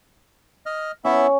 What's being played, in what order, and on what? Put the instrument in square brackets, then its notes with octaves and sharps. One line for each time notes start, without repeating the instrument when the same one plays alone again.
[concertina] D#5 F6
[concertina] B3 E4 E5 [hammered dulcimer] C#4